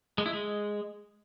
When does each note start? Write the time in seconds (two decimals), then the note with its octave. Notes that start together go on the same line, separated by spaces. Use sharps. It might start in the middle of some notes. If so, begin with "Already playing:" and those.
0.18 G#3
0.26 E4
0.33 G#3